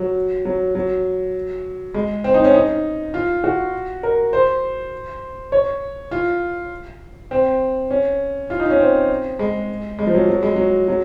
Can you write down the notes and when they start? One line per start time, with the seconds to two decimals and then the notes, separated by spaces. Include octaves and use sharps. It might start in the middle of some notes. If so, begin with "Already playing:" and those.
Already playing: F#3
0.45 F#3
0.75 F#3
1.94 G#3
2.24 C4
2.34 D#4
2.44 C#4
2.54 D#4
3.14 F4
3.44 F#4
4.03 A#4
4.33 C5
5.52 C#5
6.11 F4
7.31 C4
7.90 C#4
8.50 F4
8.60 D#4
8.70 C#4
8.80 C4
9.39 G#3
9.99 G#3
10.07 F3
10.14 F#3
10.29 F#3
10.43 G#3
10.56 F#3
10.88 F#3